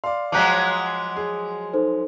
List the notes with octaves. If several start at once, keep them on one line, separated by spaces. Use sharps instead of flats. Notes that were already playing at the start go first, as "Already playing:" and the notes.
D5 F5 C6
F3 F#3 G#3 F5 A#5 D6 F#6 B6
G#4
D#4 A4 C5